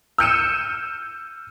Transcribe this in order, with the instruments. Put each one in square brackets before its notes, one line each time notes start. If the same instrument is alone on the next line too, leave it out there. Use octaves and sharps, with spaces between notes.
[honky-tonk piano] E6 F6 G6 C#7 D#7 E7